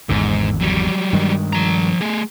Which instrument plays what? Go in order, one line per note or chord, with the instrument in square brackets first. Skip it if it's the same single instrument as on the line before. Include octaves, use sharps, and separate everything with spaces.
[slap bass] G#1 E2 D3 [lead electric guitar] G#2
[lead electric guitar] F#3 G3
[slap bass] G2 D#3 G#3
[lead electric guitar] F3 A#5
A3 G#4